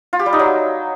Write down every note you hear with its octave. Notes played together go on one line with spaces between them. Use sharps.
F4
G4
G3
D#4
F#3